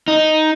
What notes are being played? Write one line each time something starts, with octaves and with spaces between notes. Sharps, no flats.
D#4